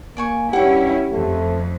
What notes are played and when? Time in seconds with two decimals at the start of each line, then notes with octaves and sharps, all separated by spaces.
0.17 A#3 D5 G#5 C#6
0.53 G2 C#4 E4 G4 F#5 G5
1.12 F2 A3